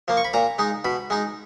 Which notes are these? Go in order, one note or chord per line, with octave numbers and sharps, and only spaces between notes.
F3 A#3
C#6
B5
A#2 A#5
G#3 D#4
B2 B5
G#3 D#4